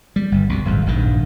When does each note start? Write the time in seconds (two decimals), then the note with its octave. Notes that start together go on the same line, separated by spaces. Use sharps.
0.16 G3
0.32 G1
0.49 C2 B2
0.65 D1 G#1 F2
0.86 D#1 A#1 G2 D#3